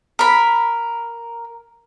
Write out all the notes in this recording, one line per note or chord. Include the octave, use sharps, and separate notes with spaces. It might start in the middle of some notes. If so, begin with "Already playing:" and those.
A#4 B5